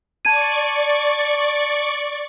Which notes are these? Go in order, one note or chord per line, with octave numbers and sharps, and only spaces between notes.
D5 A5 C#6 G#6 D#7